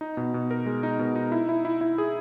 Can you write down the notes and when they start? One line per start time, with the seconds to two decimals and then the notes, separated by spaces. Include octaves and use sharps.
0.01 D#4
0.17 B2
0.34 B2
0.51 A#4
0.66 G#3
0.83 D#4
0.99 B2
1.16 D#4
1.32 E4
1.49 E4
1.65 E4
1.81 E4
1.98 G#4